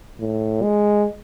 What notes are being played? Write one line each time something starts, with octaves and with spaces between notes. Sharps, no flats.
A2
G#3